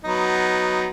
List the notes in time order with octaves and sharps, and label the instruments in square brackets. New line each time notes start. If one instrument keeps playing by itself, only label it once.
[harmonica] F#3 B3 D#4